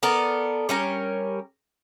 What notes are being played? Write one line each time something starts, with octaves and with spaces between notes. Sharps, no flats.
B3 A4 A#4 D5
G3 C#4 A#4